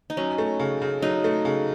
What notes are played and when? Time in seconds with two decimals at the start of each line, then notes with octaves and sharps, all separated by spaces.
0.10 D#4
0.17 F#3 C#4
0.38 A3
0.60 C#3
0.82 C#3
1.02 F#3 D#4
1.24 A3
1.45 C#3